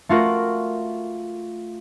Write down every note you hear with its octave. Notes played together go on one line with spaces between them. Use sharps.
A3 F4 F#4 A#4